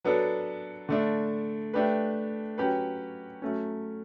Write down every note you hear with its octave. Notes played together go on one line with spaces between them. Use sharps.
F#3 B3 D4 A4
D3 A3 D4
A3 D4 G4 B4
F#3 C#4 G4 B4
F#3 A3 C#4